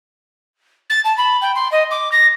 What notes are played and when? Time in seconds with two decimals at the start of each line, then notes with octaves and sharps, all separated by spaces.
0.89 A6
1.04 A5
1.17 B5
1.41 G5
1.55 C6
1.71 D#5
1.90 D6
2.11 A#6